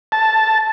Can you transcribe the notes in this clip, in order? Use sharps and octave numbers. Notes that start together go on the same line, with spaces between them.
A5